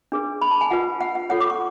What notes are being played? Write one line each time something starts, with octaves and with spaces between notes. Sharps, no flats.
D4 G#4 B4
B5
A5
G#5
F4 B4 F#5
F#5
F#5
F4 A4 C#5 F#5
D6
C#6